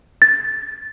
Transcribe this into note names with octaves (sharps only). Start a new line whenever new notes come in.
A6